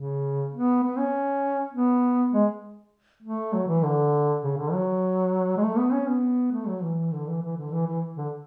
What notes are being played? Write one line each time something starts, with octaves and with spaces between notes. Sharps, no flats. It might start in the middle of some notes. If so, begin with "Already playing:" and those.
Already playing: C#3
B3
B3
C#4
B3
G#3
A3
F#3
E3
D3
C#3
D3
F#3
G#3
A3
B3
C#4
B3
A3
F#3
E3
D3
E3
E3
D3
E3
E3
D3